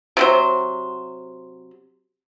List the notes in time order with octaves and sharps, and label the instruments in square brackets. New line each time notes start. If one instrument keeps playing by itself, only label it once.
[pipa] C3 F#3 C5